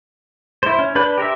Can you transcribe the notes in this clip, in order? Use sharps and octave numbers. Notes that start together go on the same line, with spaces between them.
E4 C5
C#4
D4 B4 B5 G6
G4 A#4 C5 E5